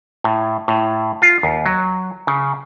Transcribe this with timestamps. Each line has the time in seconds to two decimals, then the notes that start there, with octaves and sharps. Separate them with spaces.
0.24 A2
0.68 A2
1.22 F4
1.43 D#2
1.66 F#3
2.27 C#3